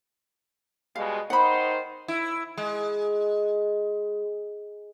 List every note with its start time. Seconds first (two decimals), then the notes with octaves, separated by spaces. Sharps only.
0.96 B2 G3 G#3 F5
1.30 D#3 D#4 C5 F#5 B5
2.08 E4
2.58 G#3